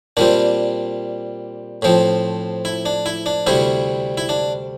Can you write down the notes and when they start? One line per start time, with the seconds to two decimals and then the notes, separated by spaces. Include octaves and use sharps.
0.17 A#2 G3 C4 D4
1.82 A2 F3 C4
2.65 E4
2.86 D4
3.06 E4
3.26 D4
3.47 D2 C3 G3 C4 E4
4.18 E4
4.29 D4